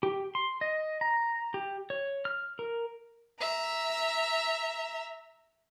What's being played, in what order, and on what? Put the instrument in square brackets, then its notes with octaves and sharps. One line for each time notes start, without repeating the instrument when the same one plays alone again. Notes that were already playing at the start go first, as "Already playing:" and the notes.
[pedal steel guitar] G4
C6
D#5
A#5
G4
C#5
F6
A#4
[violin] E5 A#5